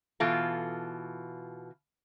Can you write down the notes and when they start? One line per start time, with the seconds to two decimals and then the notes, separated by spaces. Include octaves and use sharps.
0.20 B2 E3 F4 A4